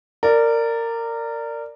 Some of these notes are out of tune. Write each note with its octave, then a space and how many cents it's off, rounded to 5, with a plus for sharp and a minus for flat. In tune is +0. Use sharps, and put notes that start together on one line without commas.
A#4 -20 D5 +0